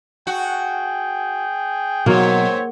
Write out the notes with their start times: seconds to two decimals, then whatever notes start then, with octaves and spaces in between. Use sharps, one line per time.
0.27 F#4 G#4 G5
2.06 G#2 B2 F#3 A#3 C4 C#5